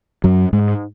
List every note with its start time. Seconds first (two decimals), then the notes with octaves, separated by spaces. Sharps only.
0.24 F#2 F#3
0.53 G#2 G#3